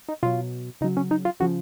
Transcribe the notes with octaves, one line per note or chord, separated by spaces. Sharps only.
D#4
B2 F#3 F4
C#3 F#3 D#4
C#4
D#4
F4
C#3 F3 F#4